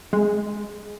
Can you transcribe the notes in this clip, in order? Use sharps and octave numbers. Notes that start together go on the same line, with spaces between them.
G#3